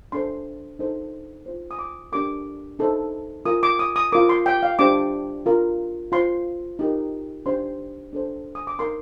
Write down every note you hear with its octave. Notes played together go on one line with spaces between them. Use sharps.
D4 A4 C5 C6
D#4 A4 C5
F4 C5
D#6
D6
D4 G4 A#4 D6
D#4 A4 C5
F4 A#4 D#6
D6
D#6
D#6
F4 A#4 D6
C6
G5
F5
D4 G4 C5 D6
F4 A#4
F4 C5 C6
D#4 G4 A#4
D4 G4 C5 C6
D4 A4 C5
D#6
D6
D#4 A#4 C6